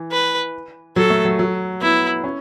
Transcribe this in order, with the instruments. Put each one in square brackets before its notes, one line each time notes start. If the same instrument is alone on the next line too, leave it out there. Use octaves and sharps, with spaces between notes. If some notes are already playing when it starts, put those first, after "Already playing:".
Already playing: [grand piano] E3
[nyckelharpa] B4
[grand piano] F#3 [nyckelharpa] A4
[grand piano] A3
F#3
F#3
[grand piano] B3 [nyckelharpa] E4
[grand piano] C#4